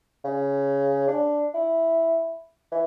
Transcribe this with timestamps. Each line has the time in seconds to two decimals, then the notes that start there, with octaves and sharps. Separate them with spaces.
0.24 C#3
1.08 D4
1.54 E4
2.71 E3